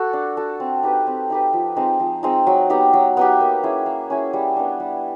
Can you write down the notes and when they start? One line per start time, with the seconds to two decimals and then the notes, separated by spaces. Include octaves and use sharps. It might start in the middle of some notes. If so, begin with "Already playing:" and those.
Already playing: F#4 A4
0.13 D4
0.37 F#4 A4
0.60 C4
0.83 D#4 G4 B4
1.07 C4
1.30 D#4 G4 B4
1.53 F3
1.76 G#3 C4 D#4
2.00 F3
2.23 G#3 C4 D#4
2.47 F#3
2.70 B3 D#4 G4
2.93 F#3
3.17 B3 D#4 G4
3.41 A#3
3.63 C#4 E4 G#4
3.86 A#3
4.10 C#4 E4 G#4
4.33 G3
4.56 B3 D4
4.80 G3